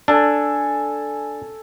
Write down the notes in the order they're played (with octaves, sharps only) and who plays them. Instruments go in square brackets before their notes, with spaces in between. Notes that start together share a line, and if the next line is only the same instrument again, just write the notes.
[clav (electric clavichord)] D4 [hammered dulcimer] A4 G#5